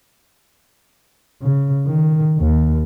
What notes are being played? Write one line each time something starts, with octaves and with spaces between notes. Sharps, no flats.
C#3
D#3
D#2